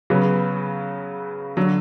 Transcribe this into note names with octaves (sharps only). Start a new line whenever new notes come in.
C#3 F#3 B3
D3 F#3